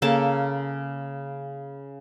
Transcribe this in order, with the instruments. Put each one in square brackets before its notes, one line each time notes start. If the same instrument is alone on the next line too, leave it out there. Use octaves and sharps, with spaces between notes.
[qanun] C#3 A#3 A4 A5